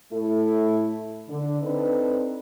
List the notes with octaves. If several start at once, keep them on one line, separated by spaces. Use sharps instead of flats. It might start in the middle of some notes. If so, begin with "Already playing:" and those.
A2 A3 E4 A4
D3
C4 D4 D#4 A4 B4